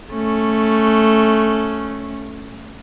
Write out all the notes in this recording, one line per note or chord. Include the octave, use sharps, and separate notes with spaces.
A3 C#4